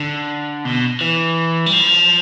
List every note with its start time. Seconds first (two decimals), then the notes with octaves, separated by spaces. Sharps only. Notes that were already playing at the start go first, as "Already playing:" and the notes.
Already playing: D3
0.65 B2
1.01 E3
1.66 G3
1.73 F3